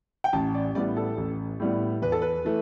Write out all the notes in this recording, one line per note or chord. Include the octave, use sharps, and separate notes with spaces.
G5
A1 A5
D5
A2 G3 B3 D5
A4
A1
A2 G3 B3
E2 B4
A4
B4
E3 A3